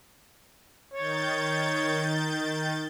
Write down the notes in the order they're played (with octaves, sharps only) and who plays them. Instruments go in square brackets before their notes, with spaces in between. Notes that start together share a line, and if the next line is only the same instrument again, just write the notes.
[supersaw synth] D#3 G6 A6 [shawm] C#5